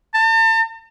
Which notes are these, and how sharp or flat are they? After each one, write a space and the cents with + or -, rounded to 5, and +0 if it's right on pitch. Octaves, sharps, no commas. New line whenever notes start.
A5 +40